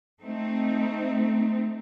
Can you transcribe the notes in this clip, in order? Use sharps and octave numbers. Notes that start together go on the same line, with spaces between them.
A3 C4 D#4